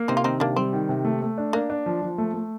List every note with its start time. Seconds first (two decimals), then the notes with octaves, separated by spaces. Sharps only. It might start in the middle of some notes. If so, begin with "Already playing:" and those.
Already playing: A#3
0.08 C3 C4 D#4
0.17 F4
0.24 D#3 C4 D#4
0.40 C3 A#3 D4
0.56 G3 C4
0.73 D#3
0.89 C3
1.05 A3
1.22 A3
1.38 D4
1.53 A#3 D4
1.70 D4
1.86 F3
2.02 F3
2.18 A3
2.34 A3